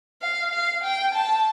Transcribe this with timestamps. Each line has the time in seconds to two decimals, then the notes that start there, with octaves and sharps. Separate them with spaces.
0.22 F5
0.53 F5
0.84 G5
1.14 A5